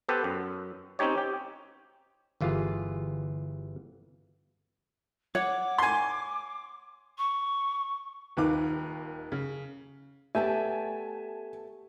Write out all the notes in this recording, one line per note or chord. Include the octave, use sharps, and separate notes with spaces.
B3 G4 A4 B4 C5
F#2
C4 C#4 D#4 G4 C#5
G4
G1 E3 F4 G4 G#4
C#5 F#5 D6
G#5 C6
C#6
D#1 D#2 D#3 B4 F5 D6
C#3
A3 B3 G4 D5 E5 G#5 A5